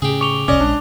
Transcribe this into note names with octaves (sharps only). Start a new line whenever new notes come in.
A2 C#3 G4 G#4
C#6 D6 F7 G7
E1 C2 C#4 D5 D#5 A#5 D6
A#1 G#3 D4